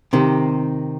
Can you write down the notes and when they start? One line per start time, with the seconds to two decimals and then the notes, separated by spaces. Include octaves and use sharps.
0.13 C3 D#3